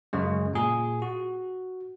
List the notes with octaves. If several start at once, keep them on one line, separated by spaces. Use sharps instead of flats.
F#2 C#3 G#3
A#2 G#4
F#4